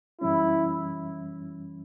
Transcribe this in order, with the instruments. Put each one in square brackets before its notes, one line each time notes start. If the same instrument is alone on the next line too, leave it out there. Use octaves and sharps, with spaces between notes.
[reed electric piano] F#2 E3 G3 C#4 [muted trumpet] E4